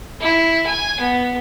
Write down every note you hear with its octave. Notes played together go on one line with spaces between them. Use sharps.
E4
G#5
B3